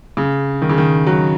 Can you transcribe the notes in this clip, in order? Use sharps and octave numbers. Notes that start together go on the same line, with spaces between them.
C#3
D#3
C#3
D#3
F#3